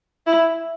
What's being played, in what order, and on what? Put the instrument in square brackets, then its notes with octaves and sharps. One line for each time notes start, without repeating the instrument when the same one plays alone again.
[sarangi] E4